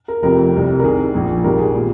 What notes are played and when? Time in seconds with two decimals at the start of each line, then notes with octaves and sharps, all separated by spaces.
0.08 A#4
0.23 F1 F2 C3 F3 A#4
0.54 C2 C3 G3
0.79 A#4
0.83 C2 C3 D#3 G#4
1.14 A#1 A#2 F3
1.44 G#1 G#2 G3 A#4
1.59 G#4
1.74 A#2 G3